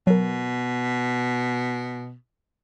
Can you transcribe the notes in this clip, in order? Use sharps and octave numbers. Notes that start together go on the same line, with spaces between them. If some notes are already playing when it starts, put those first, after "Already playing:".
B2 F#3 A#4